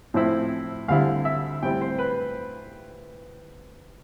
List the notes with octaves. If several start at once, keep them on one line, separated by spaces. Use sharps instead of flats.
A2 F3 C4 E4
D2 D3 G3 C4 E4 F5
E5
A2 G3 C4 E4 G5
C5
B4